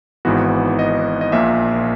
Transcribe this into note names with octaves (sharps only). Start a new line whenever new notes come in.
G#1 G#2 E3 B3 F#4
D#5
D#5
A#1 A#2 A#3 E5